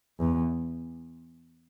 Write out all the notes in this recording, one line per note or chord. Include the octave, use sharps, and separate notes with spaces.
E2